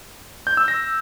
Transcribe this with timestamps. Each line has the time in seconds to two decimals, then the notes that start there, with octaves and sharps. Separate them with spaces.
0.47 G6
0.57 E6
0.68 A#6